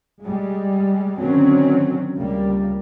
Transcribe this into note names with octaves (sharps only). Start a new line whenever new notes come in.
G3 G#3
D3 D#3 F#3 C4 C#4
C#2 G3 A#3